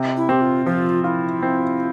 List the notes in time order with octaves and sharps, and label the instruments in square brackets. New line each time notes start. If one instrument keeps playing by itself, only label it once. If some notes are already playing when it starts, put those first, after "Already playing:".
Already playing: [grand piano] C3
[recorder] E4
[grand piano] C4 [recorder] G4
[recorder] F4
[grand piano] F3 [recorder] F4
[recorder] E4 [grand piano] F4
[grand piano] C4